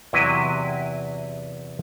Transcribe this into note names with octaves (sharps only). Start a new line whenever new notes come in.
E2 C3 F#3 E4 B4 D#5